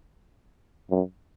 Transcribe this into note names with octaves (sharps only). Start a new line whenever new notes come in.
F#2